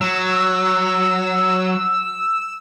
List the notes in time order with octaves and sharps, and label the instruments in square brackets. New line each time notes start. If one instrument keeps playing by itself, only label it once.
[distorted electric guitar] F#3 [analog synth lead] E6